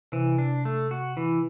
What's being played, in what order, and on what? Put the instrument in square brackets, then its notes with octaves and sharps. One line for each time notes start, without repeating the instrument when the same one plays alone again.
[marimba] C3 [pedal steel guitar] E3
[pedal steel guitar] D4
A3
F#4
E3